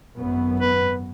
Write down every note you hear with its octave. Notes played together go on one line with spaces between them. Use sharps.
G#1 F#2 B3
B4